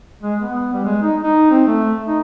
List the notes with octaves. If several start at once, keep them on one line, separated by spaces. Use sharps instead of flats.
G#3
B3
G3
G#3
D#4
D#4
C4
A3
D#4